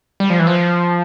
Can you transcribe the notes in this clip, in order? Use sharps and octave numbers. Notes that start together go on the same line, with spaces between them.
G3
F3
E3
F3